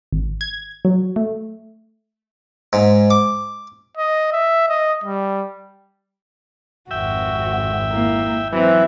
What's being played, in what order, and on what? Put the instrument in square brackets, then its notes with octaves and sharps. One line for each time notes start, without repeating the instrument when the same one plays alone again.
[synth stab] G#1
G#6
F#3
A3
[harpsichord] G#2
D6
[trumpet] D#5
E5
D#5
G3
[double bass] G#1 F2 [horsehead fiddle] F#4 [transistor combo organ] E5 G5
[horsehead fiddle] A#3 E4
[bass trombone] E3 [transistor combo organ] F#3 [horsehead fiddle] C4 E5